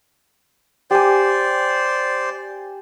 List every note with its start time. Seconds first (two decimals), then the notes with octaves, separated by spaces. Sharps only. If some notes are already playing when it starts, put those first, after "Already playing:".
0.91 G4 C5 D5 G#5